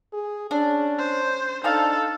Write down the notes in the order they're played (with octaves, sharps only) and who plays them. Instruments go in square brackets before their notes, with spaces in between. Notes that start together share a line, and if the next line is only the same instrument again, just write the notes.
[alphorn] G#4
[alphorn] C#4 [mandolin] D4
[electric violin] C5
[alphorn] D4 [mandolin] D#4 F5 A5 [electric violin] A4